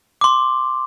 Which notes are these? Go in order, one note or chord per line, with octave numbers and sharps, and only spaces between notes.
C6 D6